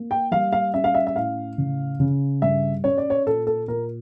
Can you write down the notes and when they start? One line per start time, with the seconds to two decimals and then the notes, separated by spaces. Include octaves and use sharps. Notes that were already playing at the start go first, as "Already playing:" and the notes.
Already playing: A#3
0.11 G5
0.31 G3 F5
0.52 F5
0.74 C#4 E5
0.84 F5
0.94 E5
1.07 E5
1.16 A2 F5
1.58 C#3
2.00 C#3
2.42 G2 E5
2.84 C#4 C#5
2.98 D5
3.10 C#5
3.26 A#2 A4
3.47 A4
3.68 A#2 A#4